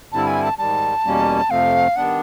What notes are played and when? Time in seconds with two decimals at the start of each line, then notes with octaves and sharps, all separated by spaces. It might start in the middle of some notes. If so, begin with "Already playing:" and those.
0.12 G2 D3 G3 C4 E4 A5
0.27 G#5
0.43 A5
0.58 G#2 D#3 G3 A5
1.04 E2 B2 G3 A#3 C#4
1.50 F2 C3 F3 A3 C4 F5
1.96 D#3 G3 B3 D4 F#5